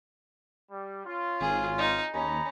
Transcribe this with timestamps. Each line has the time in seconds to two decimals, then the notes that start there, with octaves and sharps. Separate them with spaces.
0.71 G3
1.06 C#4 F4
1.40 G#1 G#4
1.78 D#4
2.14 D#2 C#4 D#4 A#5 B5